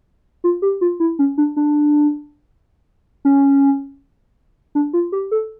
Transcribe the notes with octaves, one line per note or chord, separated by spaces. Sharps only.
F4
G4
F4
E4
C#4
D4
D4
C#4
D4
F4
G4
A4